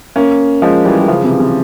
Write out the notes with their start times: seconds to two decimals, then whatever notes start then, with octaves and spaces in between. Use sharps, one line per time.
0.16 A#3 C#4
0.62 F3 G#3
0.85 E3 G3
1.00 G3
1.08 C#3 F3
1.24 C3 E3
1.39 C3 E3